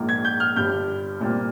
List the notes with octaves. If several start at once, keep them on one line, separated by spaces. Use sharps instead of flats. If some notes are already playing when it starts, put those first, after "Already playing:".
Already playing: A#1 G#2 F3 A#3
G#6
G6
F6
G1 G2 G3 G6
C2 A#2 G3 C4